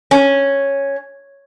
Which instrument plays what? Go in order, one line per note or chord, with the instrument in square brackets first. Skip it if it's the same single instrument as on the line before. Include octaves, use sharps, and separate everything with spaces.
[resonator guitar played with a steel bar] C#4